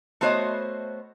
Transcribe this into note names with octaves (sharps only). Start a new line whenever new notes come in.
A3 B3 F#4 C5 C#5 D#5